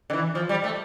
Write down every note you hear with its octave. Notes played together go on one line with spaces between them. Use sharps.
D3
E3
F3
G3
A3